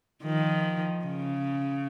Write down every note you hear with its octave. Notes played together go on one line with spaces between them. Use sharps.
D#3 F3
C#3